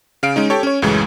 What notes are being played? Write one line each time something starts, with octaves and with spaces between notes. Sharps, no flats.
C#3 F5 D7
G#3 C#4 D#4
G4 A4 C#5
C#4 C#5
C#2 F#2 A2 C#3 E3 G#3